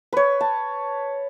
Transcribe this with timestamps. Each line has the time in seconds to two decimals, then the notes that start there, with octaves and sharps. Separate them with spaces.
0.13 B4 C#5
0.41 A5